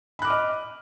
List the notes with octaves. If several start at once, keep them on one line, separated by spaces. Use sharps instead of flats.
D#5 B5 D6 F6 F#6